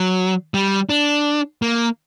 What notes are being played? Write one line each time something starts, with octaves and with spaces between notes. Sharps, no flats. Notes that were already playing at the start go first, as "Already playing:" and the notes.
Already playing: F#3
G3
D4
A#3